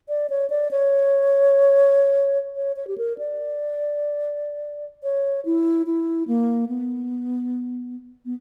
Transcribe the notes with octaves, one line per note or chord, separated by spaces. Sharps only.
D5
C#5
D5
C#5
C#5
C#5
G4
A#4
D5
C#5
E4
E4
A#3
B3
B3